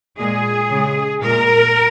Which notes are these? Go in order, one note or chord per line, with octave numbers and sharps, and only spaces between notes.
A#2 G#3 G#4
C#3 G#3
A#2 G#3 A#4